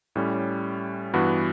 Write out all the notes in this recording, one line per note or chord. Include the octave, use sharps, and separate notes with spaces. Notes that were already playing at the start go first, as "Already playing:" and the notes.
A2 G3 C#4
G2 E3 B3 F#4